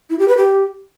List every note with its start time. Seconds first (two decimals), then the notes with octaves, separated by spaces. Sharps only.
0.10 E4
0.19 G4
0.28 B4
0.37 G4